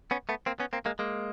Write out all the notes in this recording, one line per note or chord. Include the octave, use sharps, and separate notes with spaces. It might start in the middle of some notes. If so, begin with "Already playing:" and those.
B3 C#4
A3 B3
A#3 C4
B3 C#4
A#3 C4
G#3 A#3
G#3 A#3